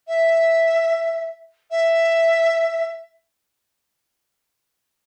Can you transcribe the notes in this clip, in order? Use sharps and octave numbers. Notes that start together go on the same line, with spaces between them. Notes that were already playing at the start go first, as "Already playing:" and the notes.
E5
E5